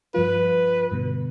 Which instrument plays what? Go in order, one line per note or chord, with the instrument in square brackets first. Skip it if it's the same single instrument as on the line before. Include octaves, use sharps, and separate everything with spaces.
[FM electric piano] G2 F3 F4 [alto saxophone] B4
[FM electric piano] G2 B2 D3